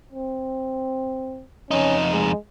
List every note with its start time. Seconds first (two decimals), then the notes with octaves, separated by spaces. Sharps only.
0.13 C4
1.71 F2 C#4 D#4
2.12 G#3